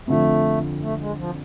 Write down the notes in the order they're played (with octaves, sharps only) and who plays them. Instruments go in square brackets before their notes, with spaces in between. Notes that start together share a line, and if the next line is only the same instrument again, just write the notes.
[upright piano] F2 D3 F3 [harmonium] A3
[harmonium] A3
G#3
F3